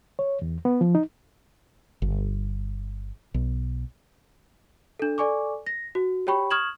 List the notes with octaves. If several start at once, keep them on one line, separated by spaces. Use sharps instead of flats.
C#5
E2
B3
F3
D#4
G1
B1
D4 A4
A4 D5 G#5 C#6 D6
A#6
F#4
G4 C#5 G5 B5 C#6
C#6 D#6 F6 G#6 E7 F#7